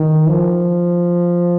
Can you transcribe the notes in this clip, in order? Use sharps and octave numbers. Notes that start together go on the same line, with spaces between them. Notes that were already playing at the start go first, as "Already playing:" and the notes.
Already playing: D#3
F3